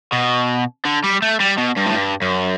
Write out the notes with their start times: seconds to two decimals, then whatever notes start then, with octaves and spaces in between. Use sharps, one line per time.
0.12 B2
0.85 D3
1.04 G3
1.22 A3
1.40 G3
1.58 B2
1.77 G2
1.86 A2
1.95 G2
2.22 F#2